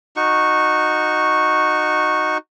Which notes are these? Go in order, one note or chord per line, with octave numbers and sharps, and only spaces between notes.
D#4 F#4 C#6